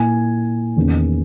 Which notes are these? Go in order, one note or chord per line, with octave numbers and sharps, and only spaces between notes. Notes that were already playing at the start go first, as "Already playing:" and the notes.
Already playing: A#2 A#3 E4 G#5
E2 D#3 A#3 C#4